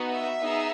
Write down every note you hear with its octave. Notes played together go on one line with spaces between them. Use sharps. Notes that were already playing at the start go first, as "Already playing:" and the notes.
Already playing: B3 D#4 F#4
E5
B3 D#4 G#4